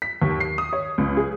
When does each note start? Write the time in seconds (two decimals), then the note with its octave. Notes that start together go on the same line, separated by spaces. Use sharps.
0.02 B6
0.22 D#2
0.40 C7
0.58 D#6
0.73 C#5
0.98 C#2
1.17 G#4